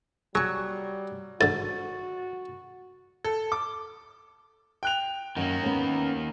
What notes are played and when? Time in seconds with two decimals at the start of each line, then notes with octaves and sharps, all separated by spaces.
0.35 F#3 G3 G#4 C#6
1.41 G#2 D3 F#4 A6
3.24 A4
3.52 D6
4.83 G5 F#6 F7
5.37 F#2 D#3 A#3
5.63 B3 C#4